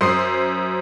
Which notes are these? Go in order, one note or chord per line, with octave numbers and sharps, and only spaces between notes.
F#2 C5 C6 D#6 C7